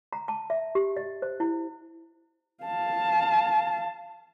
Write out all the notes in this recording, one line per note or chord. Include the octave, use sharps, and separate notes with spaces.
A#5
A5
E5
G4
D#5
C5
E4
F5 A5